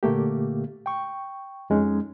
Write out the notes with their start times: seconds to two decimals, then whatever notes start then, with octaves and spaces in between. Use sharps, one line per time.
0.03 A#2 D3 A3 A#3 G4
0.86 G5 C#6
1.70 F2 G#3 C#4 D#4